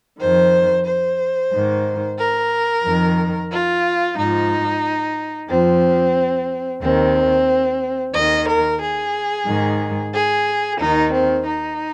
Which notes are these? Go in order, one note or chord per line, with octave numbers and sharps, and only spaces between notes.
F2 D#3 C5
C5
G#2 D#3
A#4
F2 D#3
F4
G#2 F3 D#4
F2 F3 C4
D#2 D#3 C4
D#2 D#3 D#5
A#4
G#4
G#2 D#3
G#4
D#2 D#3 D#4
C4
D#4